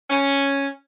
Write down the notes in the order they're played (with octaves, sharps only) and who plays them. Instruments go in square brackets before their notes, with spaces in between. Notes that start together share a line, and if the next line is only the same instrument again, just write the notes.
[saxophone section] C#4